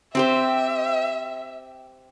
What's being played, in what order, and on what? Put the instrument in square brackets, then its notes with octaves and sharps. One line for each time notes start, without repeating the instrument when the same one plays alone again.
[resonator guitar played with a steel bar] C4 G4 C5 [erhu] E5